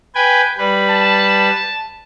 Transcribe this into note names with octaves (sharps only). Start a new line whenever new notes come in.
B4 G5 G#5
G3 B4
A5